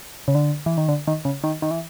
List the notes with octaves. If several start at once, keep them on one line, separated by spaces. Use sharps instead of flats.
C#3
D3
E3
D#3
D3
D#3
C#3
D#3
D#3
E3